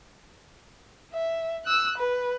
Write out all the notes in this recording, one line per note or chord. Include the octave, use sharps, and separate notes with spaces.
E5
E6 F#6
B4